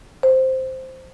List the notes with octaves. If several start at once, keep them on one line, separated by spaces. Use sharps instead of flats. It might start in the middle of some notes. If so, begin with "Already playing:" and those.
C5